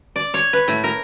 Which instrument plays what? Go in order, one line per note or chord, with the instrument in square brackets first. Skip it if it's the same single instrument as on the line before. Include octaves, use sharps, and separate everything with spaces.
[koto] D5
C#5
B4
A2
A#4